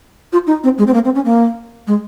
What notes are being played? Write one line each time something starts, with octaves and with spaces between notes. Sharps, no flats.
F4
D#4
C4
G#3
C4
A#3
C4
C#4
A#3
G#3